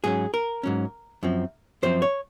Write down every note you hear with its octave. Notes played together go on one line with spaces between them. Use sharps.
G#2 F#3 C#4 G#4
A#4
G#2 F#3 C#4
F#2 F3 C4
F#2 F3 C4 C5
C#5